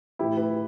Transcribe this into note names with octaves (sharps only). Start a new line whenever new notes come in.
A2 E3 E4 G4
G4 B4